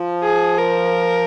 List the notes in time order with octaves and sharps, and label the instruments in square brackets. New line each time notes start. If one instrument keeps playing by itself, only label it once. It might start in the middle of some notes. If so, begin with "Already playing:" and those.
Already playing: [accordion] F3
[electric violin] G#4
A#4